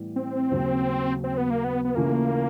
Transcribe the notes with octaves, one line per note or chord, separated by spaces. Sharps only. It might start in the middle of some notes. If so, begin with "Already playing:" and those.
Already playing: A2 E3 G3 B3
C4
D#2 C#3 F#3
C4
B3
A#3
B3
B3
C#3 E3 A3 A#3 C#4 F4